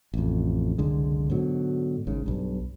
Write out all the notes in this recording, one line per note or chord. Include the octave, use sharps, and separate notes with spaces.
A1 F2
F#1 C2 D3 G#3
G#2 B2 D3 F#3
G#1 G#2 C#3
B1 G2